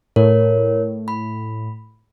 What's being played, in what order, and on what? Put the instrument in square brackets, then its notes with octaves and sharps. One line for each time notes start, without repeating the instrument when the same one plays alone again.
[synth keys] A2 [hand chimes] A#4 C#5
[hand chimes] B5